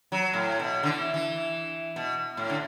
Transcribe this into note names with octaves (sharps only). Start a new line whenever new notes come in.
F#3
A2
B2
D3
E3
E3
B2
A2
D3